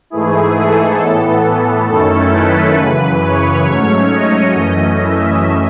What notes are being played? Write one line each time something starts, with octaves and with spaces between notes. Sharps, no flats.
G#2 E3 A3 E4 G#4
A4
A2 E3 B3
F#2 D#3 A3 C#4 E4 A4
B4
F#2 C#3 E3
C#5
G#2 F#3 A3 C#4
D#5
F#2 E3 A3 C#4
E5